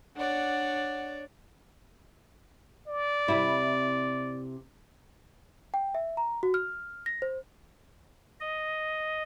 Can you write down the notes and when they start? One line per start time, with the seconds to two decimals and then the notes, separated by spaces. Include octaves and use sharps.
0.17 D4 C#5 D5 F#5
2.88 D5
3.28 C3 E4
5.74 G5
5.95 E5
6.17 A#5
6.43 F#4
6.54 F6
7.06 A#6
7.22 C5
8.40 D#5